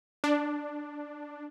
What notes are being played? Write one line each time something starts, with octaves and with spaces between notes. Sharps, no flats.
D4